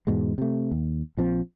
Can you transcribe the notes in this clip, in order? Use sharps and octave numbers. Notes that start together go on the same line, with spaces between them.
E2 G#2 B2 G#3
C3 A3
D#2
A#1 F3 C4